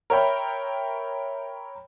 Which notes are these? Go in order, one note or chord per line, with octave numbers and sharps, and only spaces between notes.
A#4 C#5 E5 G5 B5